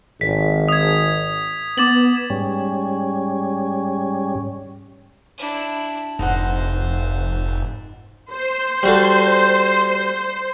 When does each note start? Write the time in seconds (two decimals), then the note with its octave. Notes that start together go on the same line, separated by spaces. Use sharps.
0.21 G#1 B6
0.69 D#6 G#6
1.78 B3 D6 A6 F#7
2.30 G#2 G3 C#4
5.38 D4 E4
6.19 F1 F2 G#2 D#4 C5 D#5 F#5
8.33 C5
8.83 G3 F#4 A4